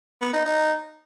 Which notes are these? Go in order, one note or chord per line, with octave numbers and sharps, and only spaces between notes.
B3
D#4
D#4